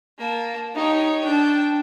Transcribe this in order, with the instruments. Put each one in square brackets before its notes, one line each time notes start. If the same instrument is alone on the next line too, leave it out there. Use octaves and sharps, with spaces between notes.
[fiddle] A#3 A5
[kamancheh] D#4 [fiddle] G4 C#5
[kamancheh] D4 [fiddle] G5 A5